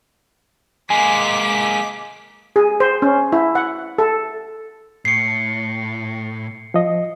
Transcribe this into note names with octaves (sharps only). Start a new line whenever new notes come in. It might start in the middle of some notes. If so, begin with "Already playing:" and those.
G#3 A#3 G#5 D6 B6
G#4
C5
C#4
E4
F#5
A4
A2 C7 C#7
F3 D#5